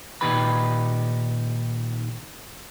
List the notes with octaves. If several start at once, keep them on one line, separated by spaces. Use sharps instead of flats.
A#2 D#3 D#4 G4 B4 B5